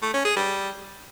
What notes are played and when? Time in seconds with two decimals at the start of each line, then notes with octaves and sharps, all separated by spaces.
0.02 A3
0.14 C#4
0.25 G#4
0.36 G3